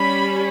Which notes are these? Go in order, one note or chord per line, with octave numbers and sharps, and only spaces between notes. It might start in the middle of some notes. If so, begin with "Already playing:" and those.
Already playing: G3 C#4 B5